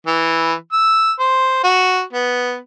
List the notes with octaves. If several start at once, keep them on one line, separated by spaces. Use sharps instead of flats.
E3
E6
C5
F#4
B3